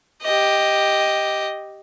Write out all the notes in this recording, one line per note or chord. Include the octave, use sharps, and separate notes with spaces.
G4 D#5